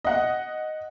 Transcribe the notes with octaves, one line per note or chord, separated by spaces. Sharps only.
D#5 F#5